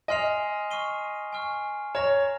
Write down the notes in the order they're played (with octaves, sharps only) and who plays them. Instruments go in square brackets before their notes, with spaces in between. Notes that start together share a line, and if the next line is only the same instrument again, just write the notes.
[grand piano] D#5 [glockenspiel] G#5 C6 F6 C7 F7
[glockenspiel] C#6 F6 C7 D#7 G7
G#5 C#6 F6 C7
[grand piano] C#5 [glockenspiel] A#5 F6 A#6 F7